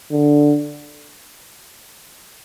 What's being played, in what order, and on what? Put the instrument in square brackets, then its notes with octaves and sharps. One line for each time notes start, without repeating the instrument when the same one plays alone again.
[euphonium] D3